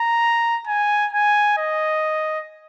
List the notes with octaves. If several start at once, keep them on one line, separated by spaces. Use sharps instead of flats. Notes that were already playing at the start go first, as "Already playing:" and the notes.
Already playing: A#5
G#5
G#5
D#5